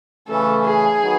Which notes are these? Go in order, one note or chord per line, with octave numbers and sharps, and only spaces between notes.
C#3 E3 A3 C#4 A4
G#4
D#3 F#3 B3